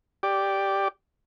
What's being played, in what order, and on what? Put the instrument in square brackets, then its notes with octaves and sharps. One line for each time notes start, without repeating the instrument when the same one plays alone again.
[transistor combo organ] G4 D5